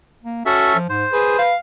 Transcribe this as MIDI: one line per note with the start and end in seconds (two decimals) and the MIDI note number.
0.23 0.46 58
0.46 0.77 61
0.46 0.71 66
0.46 0.77 69
0.46 0.77 76
0.75 0.88 53
0.90 1.05 44
0.90 1.42 72
1.13 1.36 68
1.13 1.51 71
1.39 1.56 77